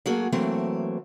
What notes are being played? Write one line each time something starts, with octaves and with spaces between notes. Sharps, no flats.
F#3 A3 A#3 F#4 G#4
E3 F#3 A3 A#3 C4